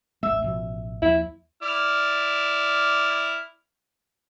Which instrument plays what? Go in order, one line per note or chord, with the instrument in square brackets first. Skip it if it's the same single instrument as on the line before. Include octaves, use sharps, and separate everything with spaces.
[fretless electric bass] E1 A1 A3 [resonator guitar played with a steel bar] E5
[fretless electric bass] A1 B2 F3
[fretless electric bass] D#2 F3 [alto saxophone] E4
[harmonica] E4 D5 F6